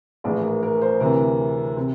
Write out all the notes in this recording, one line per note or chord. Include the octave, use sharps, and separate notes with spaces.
A#1 A2 E3 D5
A#4
A#4
C5
D2 C3 E3 A#4
C3